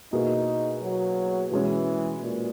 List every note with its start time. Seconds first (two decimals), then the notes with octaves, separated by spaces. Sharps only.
0.13 B2 A#3 D#4 E4 G#4 B4
0.82 F#3
1.51 B2 E3 G#3 C#4
2.22 A#2